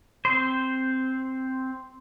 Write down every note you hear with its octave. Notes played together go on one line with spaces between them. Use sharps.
C4 C5